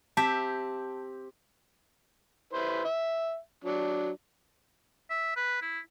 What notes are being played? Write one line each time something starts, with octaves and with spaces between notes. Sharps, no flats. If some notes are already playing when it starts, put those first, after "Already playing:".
C4 G4 E5 A5
E4 B4 C5
E5
F#3 D4
E5
B4
E4